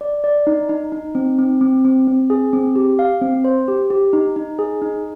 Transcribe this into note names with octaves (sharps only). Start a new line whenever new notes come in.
D5
D5
D#4
D#4
D#4
C4
C4
C4
C4
C4
G#4
C4
G4
F5
C4
C5
G4
G4
D#4
D#4
G#4
D#4